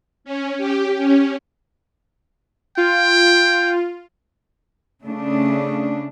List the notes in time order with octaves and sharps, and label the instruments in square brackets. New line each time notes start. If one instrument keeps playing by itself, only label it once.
[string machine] C#4
G4
C#4
[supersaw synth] F4 [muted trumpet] G5
[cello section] C#3 A3 D4